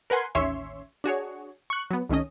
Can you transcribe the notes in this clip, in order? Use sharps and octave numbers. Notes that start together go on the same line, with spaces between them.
A#4 B4 F#5 G#5 C6
A1 D#2 C#4 C#5 E5 C6
D4 F#4 G#4 C#5
C#6 F#6
F#3 B3
C2 D#3 A3 C#4 D#5